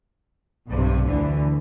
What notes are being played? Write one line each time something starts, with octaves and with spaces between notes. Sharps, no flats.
B1 G2 C3
D2 D3 E3